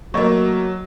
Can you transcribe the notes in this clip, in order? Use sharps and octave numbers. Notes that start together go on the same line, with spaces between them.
F#3 A3 A#3 F#4 D#5 C#6